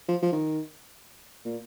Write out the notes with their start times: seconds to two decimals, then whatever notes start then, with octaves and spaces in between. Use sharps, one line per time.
0.09 F3
0.22 F3
0.32 D#3
1.45 A#2